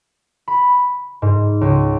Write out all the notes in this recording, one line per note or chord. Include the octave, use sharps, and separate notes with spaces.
B5
G#2
C#2